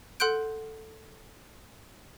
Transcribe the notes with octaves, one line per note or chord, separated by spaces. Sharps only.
A4 F#5 C6 F#6 G6 D7